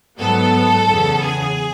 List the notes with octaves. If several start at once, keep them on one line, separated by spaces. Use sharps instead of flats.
G#2 F#3 B3 A4
E2 C#3 E3 B3
G#4